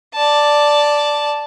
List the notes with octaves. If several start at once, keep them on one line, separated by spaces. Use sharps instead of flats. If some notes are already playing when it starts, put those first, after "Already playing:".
D5 A5